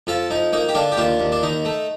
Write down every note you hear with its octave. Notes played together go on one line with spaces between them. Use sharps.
F2 F4 A4
F2 D#4
A#3 D#4
G4
D3 D4 F4
G4
D#2 D4 F4
D#2
D4
D#2 D#4
A3